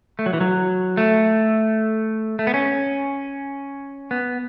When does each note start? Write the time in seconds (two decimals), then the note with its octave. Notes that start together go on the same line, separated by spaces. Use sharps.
0.19 A3
0.26 F#3
0.33 E3
0.41 F#3
0.97 A3
2.39 A3
2.47 B3
2.54 C#4
4.11 B3